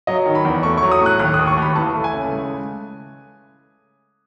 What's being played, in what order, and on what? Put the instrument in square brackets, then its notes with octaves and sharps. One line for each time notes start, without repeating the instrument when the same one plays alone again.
[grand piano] F#3 D#5
D#3
B5
E2
A3 C#6
C#6
F#3
D#6
A2
F#6
D#2 F#6
D#6
D#2
C#6
D#2 B5
E3 A5
A3
G#5
C#3
G#3